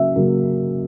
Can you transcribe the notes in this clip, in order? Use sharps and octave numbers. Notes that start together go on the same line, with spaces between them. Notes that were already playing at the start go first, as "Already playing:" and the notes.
Already playing: C#3 F#3 A#3 E5
C#3 F#3 A#3